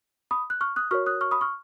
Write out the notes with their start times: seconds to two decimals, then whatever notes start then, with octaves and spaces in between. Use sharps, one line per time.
0.31 B5 D#6
0.50 F#6
0.61 C#6 F6
0.76 D#6 F#6
0.91 F#4 A#4 C#5 C#6 F6
1.06 D#6 F#6
1.21 C#6 F6
1.31 B5 D#6
1.41 C#6 F6